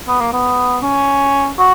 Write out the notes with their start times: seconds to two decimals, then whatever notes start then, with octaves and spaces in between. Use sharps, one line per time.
0.07 B3
0.20 A#3
0.33 B3
0.82 C#4
1.58 F#4